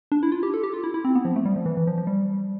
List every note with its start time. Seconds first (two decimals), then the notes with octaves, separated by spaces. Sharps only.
0.12 D4
0.23 E4
0.32 F4
0.43 G4
0.54 A4
0.64 G4
0.74 F4
0.84 E4
0.94 E4
1.05 C4
1.15 B3
1.25 F3
1.36 A3
1.45 G3
1.56 F3
1.66 E3
1.77 E3
1.87 F3
1.98 F3
2.07 G3